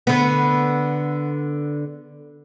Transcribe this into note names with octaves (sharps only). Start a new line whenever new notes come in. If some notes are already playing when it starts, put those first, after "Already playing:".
D3 B3